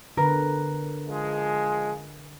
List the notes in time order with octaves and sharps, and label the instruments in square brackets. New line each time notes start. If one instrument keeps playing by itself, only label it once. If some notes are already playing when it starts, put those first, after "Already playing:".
[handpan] D3 B4 [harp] A#4
[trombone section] F3 G#3